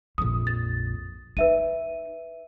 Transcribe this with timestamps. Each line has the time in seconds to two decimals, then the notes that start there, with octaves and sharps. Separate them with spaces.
0.18 A#1 F2 D#6
0.47 A6
1.37 D#4 B4 E5 D#7